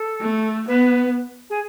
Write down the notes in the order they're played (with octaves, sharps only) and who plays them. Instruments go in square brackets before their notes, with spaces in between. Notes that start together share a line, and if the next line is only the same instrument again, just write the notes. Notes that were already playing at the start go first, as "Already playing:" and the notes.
Already playing: [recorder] A4
[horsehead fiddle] A3
[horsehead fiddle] B3 [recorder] B4
[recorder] G#4